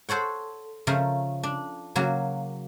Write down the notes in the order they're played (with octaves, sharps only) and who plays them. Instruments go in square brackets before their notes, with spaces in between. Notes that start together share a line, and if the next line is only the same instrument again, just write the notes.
[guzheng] A4 C5 C#5 F#5
C#3 F3 A3 A#4
D4
C#3 F#3 A#3